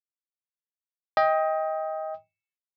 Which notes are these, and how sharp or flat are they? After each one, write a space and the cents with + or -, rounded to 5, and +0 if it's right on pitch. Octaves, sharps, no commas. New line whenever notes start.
D#5 +20 G5 +15